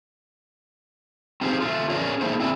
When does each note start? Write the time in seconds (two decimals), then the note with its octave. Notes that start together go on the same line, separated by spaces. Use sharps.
1.41 C4 D#4 F4 G4 G#4 C5
1.60 A3 F4
1.90 C#4 D4 G#4 A#4 C#5 D5
2.21 A3 A#3 D#4 E4 G#4 C5
2.40 C4 E4 G#4 D5